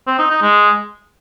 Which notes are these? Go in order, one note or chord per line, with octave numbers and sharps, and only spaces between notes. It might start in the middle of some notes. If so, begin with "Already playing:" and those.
C4
D#4
D#4
G#3